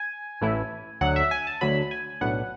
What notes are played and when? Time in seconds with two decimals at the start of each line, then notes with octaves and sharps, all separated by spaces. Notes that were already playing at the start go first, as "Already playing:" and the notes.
Already playing: G#5
0.41 A1 A2 E3 A3 E4
1.01 D2 D3 F#3 F#5
1.16 E5
1.31 G#5
1.47 A5
1.61 D2 D3 F#3 B5
1.91 G#5
2.21 B1 A2 F#3 B3 D4 F#5